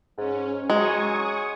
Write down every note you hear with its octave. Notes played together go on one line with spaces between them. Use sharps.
G#2 C#4
F#3 G#3 G#5 C#6 D#6